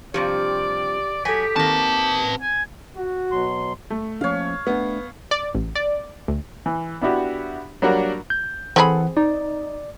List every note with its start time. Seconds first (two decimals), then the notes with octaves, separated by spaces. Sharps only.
0.14 G2 C3 F3 G4 D5
1.25 F#3 G4 A4 G#5 B6
1.56 D#3 A#3 C4 B4 A5
2.41 G#5
2.96 F#4
3.31 B2 F#3 C6
3.90 A3
4.21 F3 A#3 C#4 C#5 F5
4.67 A3 B3 D4
5.31 D5
5.54 A1
5.75 D5
6.28 D2
6.66 E3
7.01 B3 D4 E4 F#4 G4
7.82 F#3 G3 A#3 D4 F#4 A#4
8.30 G6
8.76 E3 C4 G#4 A4 F#5 B5
9.17 D#4 D5